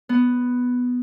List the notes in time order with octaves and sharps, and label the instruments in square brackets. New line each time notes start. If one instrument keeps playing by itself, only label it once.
[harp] B3